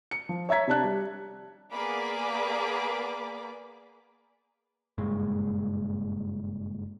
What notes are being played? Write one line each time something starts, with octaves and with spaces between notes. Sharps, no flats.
C#7
F3
C#5 E5 A#5 G#6 B6
C3 D4 A5 F#6
G3
A#3 B3 G#4 D5 B5 D6
F#1 G2 A#2 G#3